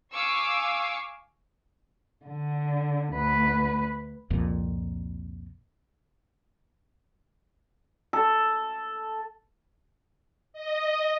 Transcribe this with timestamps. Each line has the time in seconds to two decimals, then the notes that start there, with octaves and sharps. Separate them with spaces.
0.12 F5 G#5 C#6 D6 E6
2.25 D3
3.14 D2 B4
4.30 C2 F2 A#2
8.13 A4
10.53 D#5